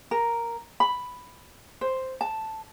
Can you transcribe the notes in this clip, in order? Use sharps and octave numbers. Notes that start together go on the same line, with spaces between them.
A#4
B5
C5
A5